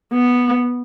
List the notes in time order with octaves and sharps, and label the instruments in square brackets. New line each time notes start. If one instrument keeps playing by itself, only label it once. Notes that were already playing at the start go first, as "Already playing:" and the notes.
[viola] B3